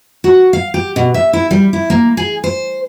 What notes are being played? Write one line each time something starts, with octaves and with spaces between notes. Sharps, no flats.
F#4
F5
G4
B2
E5
E4
G3
E4
A#3
G#4
C5